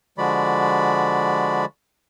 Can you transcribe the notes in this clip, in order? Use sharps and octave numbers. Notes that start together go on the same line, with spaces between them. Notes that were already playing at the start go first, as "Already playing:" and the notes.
D3 F3 G#3 F#4 D5 B5